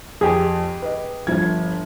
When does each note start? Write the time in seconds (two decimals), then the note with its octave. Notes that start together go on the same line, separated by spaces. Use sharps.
0.21 F2 G4 G#4
0.82 B4 D#5
1.27 G1 F3 G#6